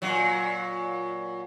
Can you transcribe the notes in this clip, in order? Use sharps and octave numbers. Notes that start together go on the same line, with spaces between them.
A#2 F#3